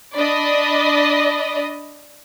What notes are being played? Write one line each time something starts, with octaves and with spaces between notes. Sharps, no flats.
D4 D5 D#5 B5